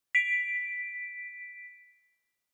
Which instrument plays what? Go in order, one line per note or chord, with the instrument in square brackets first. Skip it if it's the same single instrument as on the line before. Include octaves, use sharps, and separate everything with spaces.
[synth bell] B6 D7